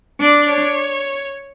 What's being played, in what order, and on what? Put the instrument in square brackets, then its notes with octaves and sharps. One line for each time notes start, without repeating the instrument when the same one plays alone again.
[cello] D4 [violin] D5
[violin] C#5